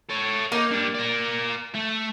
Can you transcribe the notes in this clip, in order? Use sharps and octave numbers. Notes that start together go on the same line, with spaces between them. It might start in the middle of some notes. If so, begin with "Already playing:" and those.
A4 C#5
A#3 D#4
G3 D4
A#4 D5
A3